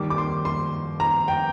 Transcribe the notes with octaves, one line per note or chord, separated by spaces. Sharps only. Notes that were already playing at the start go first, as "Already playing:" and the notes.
Already playing: D#2 D#3 G3 D6
D6
C6
C6
A#5
G5